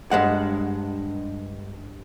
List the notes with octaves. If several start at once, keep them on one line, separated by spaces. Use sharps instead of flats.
G2 G#3 F#5